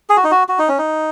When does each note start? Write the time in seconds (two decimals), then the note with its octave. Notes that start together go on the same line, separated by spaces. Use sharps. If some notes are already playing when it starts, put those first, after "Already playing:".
0.10 G#4
0.17 F#4
0.24 D#4
0.31 F#4
0.49 F#4
0.59 D#4
0.68 C#4
0.78 D#4